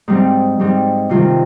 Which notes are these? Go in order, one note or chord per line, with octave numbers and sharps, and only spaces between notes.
G#2 G3 C4
G#2 G3 C4
C3 D#3 G3 F4